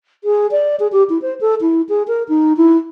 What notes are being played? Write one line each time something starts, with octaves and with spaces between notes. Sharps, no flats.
G#4
D5
G#4
G4
E4
C5
A4
E4
G#4
A#4
D#4
E4